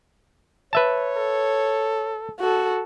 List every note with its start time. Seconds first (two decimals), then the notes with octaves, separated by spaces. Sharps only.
0.73 B4 C#5 E5 A5
1.17 A4
2.41 F#4 A4